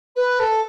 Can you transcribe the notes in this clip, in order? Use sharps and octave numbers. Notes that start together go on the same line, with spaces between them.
B4
A4